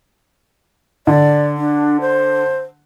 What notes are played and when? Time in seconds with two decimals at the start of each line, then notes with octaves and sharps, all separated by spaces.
1.07 D3 D5
1.57 D4
2.01 C5